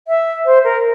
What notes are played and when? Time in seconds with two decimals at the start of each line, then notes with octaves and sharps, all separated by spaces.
0.08 E5
0.46 C5
0.64 A#4